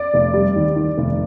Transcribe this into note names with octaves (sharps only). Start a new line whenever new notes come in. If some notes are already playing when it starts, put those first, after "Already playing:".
Already playing: D5
F1
G3
D#2
D#3
F1